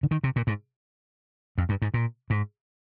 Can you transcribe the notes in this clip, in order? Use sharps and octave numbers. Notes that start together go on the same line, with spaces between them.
D3
D#3
C3
A#2
G#2
F2
G2
G#2
A#2
G#2